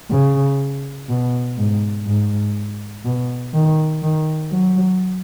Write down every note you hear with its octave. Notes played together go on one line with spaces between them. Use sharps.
C#3
B2
G#2
G#2
B2
D#3
D#3
F#3